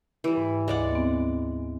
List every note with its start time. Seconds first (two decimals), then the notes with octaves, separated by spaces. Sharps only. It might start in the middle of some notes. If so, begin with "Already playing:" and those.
0.24 E3 G3
0.37 G#2
0.68 D2 G#3 D5 F#5
0.91 B3 C4